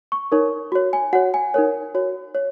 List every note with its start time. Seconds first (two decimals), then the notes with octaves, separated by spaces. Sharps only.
0.12 C#6
0.32 D#4 A#4 C#5
0.72 F#4 C#5
0.93 G#5
1.13 F#4 C#5 F#5
1.34 G#5
1.54 D#4 A#4 C#5
1.95 F#4 C#5
2.35 C#5